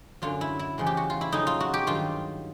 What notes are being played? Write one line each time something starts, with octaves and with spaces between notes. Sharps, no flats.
F#2 D3 F#3 F4
E4
E4
E2 C#3 F3 G#3
G4
F#4
F4
E4
F2 C#3 F#3 D#4
F4
F#4
G4
G2 D#3 F#3 F4